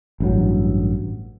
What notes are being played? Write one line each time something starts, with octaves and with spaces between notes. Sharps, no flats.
A1 G2 F#3